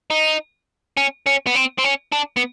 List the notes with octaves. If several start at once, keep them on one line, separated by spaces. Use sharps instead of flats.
D#4
C#4
C#4
B3
C4
C4
C#4
D4
B3